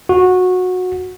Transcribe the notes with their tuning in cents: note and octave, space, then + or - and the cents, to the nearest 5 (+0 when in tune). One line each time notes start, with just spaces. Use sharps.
F#4 -20